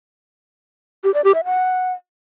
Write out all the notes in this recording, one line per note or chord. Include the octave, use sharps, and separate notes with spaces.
G4
D5
G4
E5
F#5